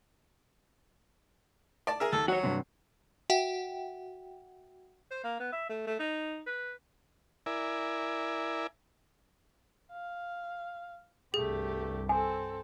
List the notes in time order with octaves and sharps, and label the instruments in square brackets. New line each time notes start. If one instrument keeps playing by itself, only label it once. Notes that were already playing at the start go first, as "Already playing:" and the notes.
[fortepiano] D5 A5
G#4 A#4 E5
[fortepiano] D#2 [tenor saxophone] A4
[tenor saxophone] F#3 [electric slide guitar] F#4 C#5
[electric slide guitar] G2 C3
[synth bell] F#4 E5 F#5 G5
[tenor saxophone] C5
A#3
B3
E5
A3
A3
D#4
B4
[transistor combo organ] E4 A#4 D5 E5 G#5
[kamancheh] F5
[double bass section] C2 G2 [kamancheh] A3 G4 [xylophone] G#4
[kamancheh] C4 A4 [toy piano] G#5